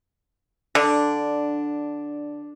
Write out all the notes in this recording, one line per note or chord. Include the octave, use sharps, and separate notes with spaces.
D3 D4